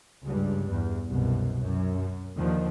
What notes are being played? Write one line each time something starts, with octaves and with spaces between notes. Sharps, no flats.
C#2 G2
E2
C2 F#2 B2
F#2
D#2 D3 D#3 F3